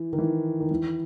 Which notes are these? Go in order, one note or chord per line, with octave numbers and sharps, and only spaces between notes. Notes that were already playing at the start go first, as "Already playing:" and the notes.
Already playing: E3
D#3
E3
D#3
E3